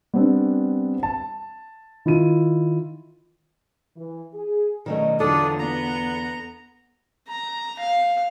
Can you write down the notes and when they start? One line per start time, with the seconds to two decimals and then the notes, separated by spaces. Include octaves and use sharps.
0.14 G3 B3 C4 D4
1.03 A5
2.06 D#3 E4 F4 D#7
3.96 E3
4.34 G#4
4.86 B2 D#3 F#3 A3 C#4 D5 D#5
5.20 E2 D3 F#3 D4 F4 A4 D5 D#6
5.59 B3 A#5
7.28 A#5
7.79 F5